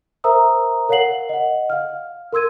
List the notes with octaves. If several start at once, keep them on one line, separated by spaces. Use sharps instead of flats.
A#4 C5 E5 A#5 D#6 E6
A#4 C#5 F5 F#5 C7 F#7
D#5 F#5
F5 F6
A#4 C6 E6 G#6 D#7